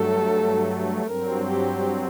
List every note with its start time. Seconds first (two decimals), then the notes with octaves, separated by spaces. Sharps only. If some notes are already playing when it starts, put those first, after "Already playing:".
Already playing: G2 F#3 A3 A4
1.06 G2 F#3 C4 A#4
1.48 G4